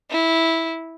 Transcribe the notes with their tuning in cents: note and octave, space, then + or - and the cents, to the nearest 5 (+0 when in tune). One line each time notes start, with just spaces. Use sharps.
E4 -10